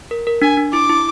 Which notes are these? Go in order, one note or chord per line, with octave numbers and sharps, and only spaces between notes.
A#4
A#4
D4 G#5
D4
E4 D6
E4